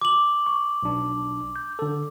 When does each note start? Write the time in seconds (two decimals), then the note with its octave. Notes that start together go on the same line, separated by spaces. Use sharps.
0.01 D6 F#7
0.46 C#6
0.83 B1 D4
1.56 G6
1.79 D3 A4